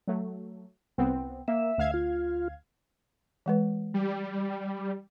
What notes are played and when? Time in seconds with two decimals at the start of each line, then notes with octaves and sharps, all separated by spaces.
0.08 F#3 A3
0.98 C2 B3 C4
1.48 A#3 E5
1.78 D2 F5 G#6
1.94 F4
3.46 E3 G#3 B4
3.94 G3